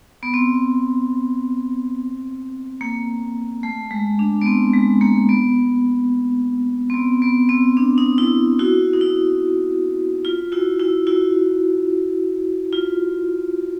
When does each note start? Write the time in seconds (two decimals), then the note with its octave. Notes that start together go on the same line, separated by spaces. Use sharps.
0.23 B3
0.34 C4
2.81 A#3
3.63 A3
3.91 G#3
4.19 D4
4.41 B3
4.46 C4
4.74 G#3
5.01 A#3
5.29 B3
6.90 C4
6.94 B3
7.22 B3
7.49 C4
7.77 D4
7.98 D#4
8.18 E4
8.59 E4 F#4
8.93 D#4
9.01 E4
10.25 F4
10.52 E4 F#4
10.79 E4 F#4
11.07 E4 F#4
12.73 F4